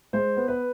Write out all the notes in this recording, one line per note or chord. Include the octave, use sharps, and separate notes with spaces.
G#3 C5
B3
B4